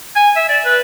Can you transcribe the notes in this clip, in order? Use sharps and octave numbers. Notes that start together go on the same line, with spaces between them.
G#5
E5
D5
B4